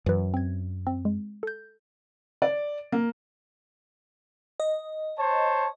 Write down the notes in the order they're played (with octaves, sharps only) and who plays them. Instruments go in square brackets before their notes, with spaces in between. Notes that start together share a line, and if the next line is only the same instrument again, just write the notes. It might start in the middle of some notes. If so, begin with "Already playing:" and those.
[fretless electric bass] F#2 [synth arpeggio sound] E3 B4
[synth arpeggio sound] C4 G#6
C4
G#3
A4 G6
[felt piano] D5
A#3
[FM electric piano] D#5
[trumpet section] C5 C#5 A5